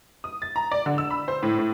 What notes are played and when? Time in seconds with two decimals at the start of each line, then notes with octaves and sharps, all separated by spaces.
0.24 D#6
0.42 A6
0.56 A#5
0.71 D5
0.86 D3
0.98 E6
1.11 B5
1.28 C5
1.43 A2
1.59 A2